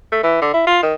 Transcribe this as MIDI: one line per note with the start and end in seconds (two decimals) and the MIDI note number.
0.12 0.21 57
0.23 0.41 52
0.42 0.53 50
0.53 0.63 64
0.67 0.79 65
0.83 0.94 51